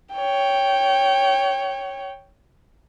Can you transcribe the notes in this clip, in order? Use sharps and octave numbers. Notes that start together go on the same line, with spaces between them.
C#5 G5